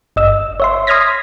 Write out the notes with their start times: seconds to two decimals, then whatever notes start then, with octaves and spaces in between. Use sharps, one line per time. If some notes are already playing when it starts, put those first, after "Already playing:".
0.16 G1 D#5 E6
0.60 C#5 E5 C6
0.87 C6 D#6 F6 G#6 A#6 B6